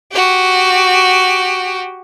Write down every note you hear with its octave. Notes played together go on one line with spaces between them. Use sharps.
F#4 G4